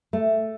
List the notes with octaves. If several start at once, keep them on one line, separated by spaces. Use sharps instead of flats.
A3